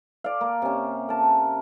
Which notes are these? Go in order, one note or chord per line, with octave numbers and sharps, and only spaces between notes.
D5 F5
A#3
C3 C#4
A#4 A5